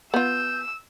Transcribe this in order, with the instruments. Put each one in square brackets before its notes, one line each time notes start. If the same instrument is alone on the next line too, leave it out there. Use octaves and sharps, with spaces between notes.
[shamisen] B3 F4 [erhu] E6 [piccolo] G6